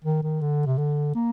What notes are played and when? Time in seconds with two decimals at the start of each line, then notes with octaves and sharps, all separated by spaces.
0.05 D#3
0.23 D#3
0.41 D3
0.66 C3
0.78 D3
1.15 A#3